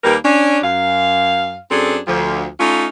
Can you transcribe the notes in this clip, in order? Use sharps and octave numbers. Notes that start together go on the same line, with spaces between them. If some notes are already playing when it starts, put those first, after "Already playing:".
D#2 G3 A#3 G4 A#4 B4
C#4 D4
F#2 F5
F#2 C4 D4 G#4 A4
D2 F3
A3 C#4 D#4 F4